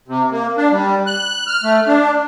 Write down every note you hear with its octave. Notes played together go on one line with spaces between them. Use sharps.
C3
A#3
D4
G3
F#6
F6
A3
D4